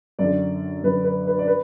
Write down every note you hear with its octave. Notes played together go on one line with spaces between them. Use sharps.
F#2 D5
D3
F#2 D3 B4
B4
B4
D5
B4